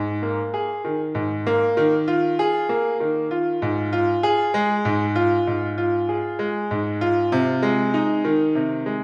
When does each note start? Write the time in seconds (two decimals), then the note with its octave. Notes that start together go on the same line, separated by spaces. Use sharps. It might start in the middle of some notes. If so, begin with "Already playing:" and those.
Already playing: G#2
0.22 A#3
0.54 G#4
0.85 D#3
1.15 G#2
1.47 A#3
1.77 D#3
2.08 F4
2.39 G#4
2.69 A#3
3.00 D#3
3.31 F4
3.62 G#2
3.93 F4
4.23 G#4
4.54 G#3
4.85 G#2
5.16 F4
5.47 G#2
5.78 F4
6.09 G#4
6.39 G#3
6.71 G#2
7.01 F4
7.32 C3
7.62 G#3
7.94 D#4
8.25 D#3
8.55 C3
8.86 G#3